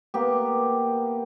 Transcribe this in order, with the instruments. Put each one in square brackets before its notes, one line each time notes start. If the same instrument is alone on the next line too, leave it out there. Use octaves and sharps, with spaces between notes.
[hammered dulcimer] A#3 B3 G4